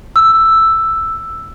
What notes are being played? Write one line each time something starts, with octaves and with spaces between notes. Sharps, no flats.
E6